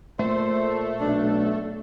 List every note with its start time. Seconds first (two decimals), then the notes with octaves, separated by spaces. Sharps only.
0.19 A#2 A3 C5
1.01 B1 D4